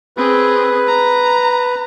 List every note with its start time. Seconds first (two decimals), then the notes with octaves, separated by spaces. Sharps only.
0.17 C4 G#4 B4
0.88 A#5